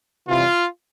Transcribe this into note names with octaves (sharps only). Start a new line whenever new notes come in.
C3 E3 G3 F4